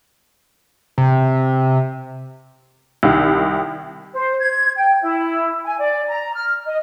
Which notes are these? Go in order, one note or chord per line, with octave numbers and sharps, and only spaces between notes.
C3
C2 D#3
C5
G#6
G5
E4
G#5
D5
A#5
F6
D#5